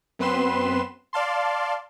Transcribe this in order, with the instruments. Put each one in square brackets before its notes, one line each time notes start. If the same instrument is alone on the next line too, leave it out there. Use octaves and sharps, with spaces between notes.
[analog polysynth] F#2 B3 C4 B4 C6 E7
D5 F5 A5 C6